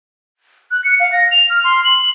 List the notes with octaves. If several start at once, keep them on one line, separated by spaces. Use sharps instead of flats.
F#6
C#7
F5
A#6
F7
F6
C6
F#7